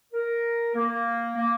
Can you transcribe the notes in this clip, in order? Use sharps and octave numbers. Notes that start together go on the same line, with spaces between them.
A#4
A#3
A#3